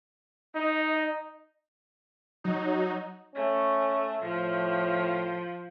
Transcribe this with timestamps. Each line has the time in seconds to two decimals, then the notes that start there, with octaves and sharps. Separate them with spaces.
0.56 D#4 D#5
2.44 F#3 D#4
3.36 A3 C#4
4.22 A2 F3